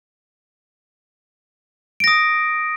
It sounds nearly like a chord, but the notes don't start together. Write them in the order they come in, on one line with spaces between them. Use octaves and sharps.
D7 A#6 D#6